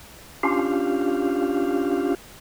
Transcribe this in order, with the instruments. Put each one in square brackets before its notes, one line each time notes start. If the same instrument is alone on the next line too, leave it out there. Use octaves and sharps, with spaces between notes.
[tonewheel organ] C#4 D4 F4 G4 F5